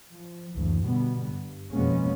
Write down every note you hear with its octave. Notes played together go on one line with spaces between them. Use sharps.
F3
F#1 D2 E3
B2 D3 G3 B3
G2
F2 B2 G#3 A#3 B3 C#4